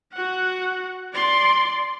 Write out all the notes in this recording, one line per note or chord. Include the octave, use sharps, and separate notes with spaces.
F#4 F#5
D5 C6